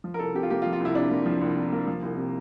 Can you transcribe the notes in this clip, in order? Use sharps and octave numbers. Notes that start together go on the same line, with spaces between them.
F3
A#4
C2 A4
C3 G4
F4
A#3 G4
F4
F3
F4
C2
E4
C3 D4
A#3
F3
C2
C3
A#3
F3
C2
C3